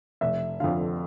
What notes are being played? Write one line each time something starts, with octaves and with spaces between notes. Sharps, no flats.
F1 E5
F2 D3 F5